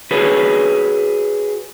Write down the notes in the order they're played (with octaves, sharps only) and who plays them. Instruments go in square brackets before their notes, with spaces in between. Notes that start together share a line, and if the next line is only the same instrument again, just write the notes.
[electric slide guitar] F#4 G#4 B4 C#5